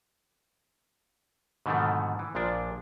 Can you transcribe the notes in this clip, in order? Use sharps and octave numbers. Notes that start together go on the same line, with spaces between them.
G#2 B2 D3 D#3 F3 A3
E3
A#1 A#2 F3 D4